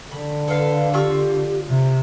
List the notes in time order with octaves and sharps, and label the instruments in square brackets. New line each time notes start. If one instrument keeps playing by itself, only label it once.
[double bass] D3 [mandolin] B5
[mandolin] A4 F5 [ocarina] B4
[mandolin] F4 C#6 E6 [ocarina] G4
[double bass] C3